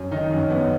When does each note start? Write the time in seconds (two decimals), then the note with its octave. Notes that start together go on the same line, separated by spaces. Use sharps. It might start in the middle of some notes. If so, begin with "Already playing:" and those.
Already playing: F#2
0.11 D#3 D#4
0.30 F#2 C#4
0.50 F#2 B3